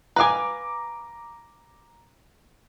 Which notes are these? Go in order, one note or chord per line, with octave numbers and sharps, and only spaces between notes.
B4 F5 G#5 A#5 D6